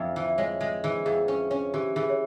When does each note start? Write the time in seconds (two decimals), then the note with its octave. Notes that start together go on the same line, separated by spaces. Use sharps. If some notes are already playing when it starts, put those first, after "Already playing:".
Already playing: F2 E5
0.16 E3
0.28 E5
0.38 G#3 C#5
0.61 G#3
0.83 E3 G#4
1.05 F2 G#4
1.28 C#4
1.51 C#4 C#5
1.74 E3 G4
1.96 E3 G#4
2.10 C#5